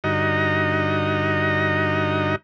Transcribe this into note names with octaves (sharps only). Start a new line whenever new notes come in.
G2 D3 D#4 F#4 D#5 A#5